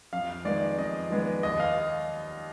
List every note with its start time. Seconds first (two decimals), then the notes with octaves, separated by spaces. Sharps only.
0.13 F2 F5
0.45 D#3 G#3 B3 D5
0.78 F2 D#5
1.10 D#3 G#3 B3
1.43 D#2 D#5
1.60 F5